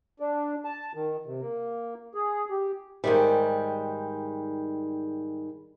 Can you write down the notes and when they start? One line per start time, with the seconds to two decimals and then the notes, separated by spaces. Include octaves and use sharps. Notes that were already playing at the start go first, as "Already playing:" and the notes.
0.20 D4
0.65 A5
0.95 D#3
1.26 C3
1.41 A#3
2.14 G#4
2.50 G4
3.04 G#2 D#3 G3